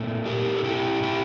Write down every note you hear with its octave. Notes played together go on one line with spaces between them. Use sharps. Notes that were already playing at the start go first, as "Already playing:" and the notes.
Already playing: A#2 A3 C4
G4 A#4
A4
E4 G4
E4 G4